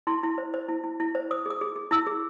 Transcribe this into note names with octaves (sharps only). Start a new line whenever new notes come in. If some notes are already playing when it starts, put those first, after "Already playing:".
E4 C6
E4
C5
C5
E4
E4
E4
C5
C5 D#6
G#4 D#6
G#4
G#4
E4 E6
G#4